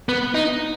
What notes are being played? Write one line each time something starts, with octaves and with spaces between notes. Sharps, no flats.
B3
D#4